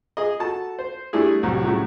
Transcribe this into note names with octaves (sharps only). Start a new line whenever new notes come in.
G#4 D#5
F#4 A4 A5
C5
G3 A3 D4 E4 G#4
C2 A2 F#3 G3
A2 C#3 F#3 A3